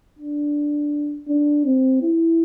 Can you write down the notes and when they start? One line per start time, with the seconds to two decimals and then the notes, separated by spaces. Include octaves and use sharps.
0.19 D4
1.28 D4
1.65 C4
2.02 E4